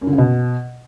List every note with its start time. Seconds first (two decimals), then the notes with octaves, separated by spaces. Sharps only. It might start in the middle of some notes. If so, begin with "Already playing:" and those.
0.01 F#2
0.07 D3
0.13 C#3
0.18 B2